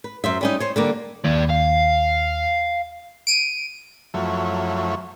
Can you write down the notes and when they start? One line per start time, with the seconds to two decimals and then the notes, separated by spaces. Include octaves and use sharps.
0.04 B4
0.24 F#2 C5 E5
0.41 G3 C#4 D#4
0.60 C5 C#5
0.76 D3 G3 A#3
1.25 D#2 B4 D5
1.50 F5
3.27 D7 D#7
4.14 F#2 F3 F#3 A3 E4 C#5